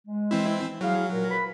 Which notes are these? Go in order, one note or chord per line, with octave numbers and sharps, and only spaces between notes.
G#3
E3 C4 E4
F#3 E4 G#4 F5
A#2 A#4
B4 B5